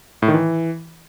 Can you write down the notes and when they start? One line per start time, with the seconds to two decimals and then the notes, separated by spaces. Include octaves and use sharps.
0.22 A2
0.28 D#3
0.34 E3